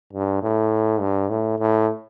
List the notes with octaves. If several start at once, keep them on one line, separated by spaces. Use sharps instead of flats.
G2
A2
G2
A2
A2